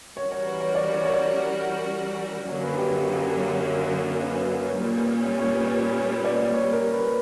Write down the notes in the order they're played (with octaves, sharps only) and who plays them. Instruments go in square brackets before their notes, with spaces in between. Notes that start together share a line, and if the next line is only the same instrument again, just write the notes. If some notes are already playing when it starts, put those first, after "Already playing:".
[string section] E3 G3 C#4 F#4 A#4 [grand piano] C#5
[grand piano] C#5
B4
C#5
D5
C#5
C#5
D5
[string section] F#2 D3 F#3 A#3 C#4 [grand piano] C#5
[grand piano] B4
G4
A#4
B4
B4
C#5
[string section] A#2 G3 C#4 [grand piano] B4
[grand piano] C#5
C#5
B4
C#5
B4
C#5
B4
D5
D5
C#5
A#4
B4